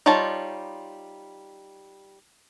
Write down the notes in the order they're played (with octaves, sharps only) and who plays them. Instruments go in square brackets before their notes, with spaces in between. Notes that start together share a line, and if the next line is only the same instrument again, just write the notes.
[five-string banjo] G3 D#4 F4 C#5 A5